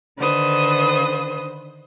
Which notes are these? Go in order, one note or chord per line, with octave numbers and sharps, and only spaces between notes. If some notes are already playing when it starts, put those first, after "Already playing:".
D3 D#3 B4 C5 D#6